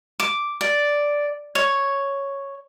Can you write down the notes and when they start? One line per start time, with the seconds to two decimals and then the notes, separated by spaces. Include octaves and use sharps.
0.20 D6
0.61 D5
1.55 C#5